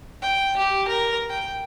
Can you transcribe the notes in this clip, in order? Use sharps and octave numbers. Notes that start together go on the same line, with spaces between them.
G5
G4
A#4
G5